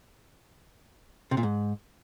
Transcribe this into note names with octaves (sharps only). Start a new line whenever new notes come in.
C3
A#2
G#2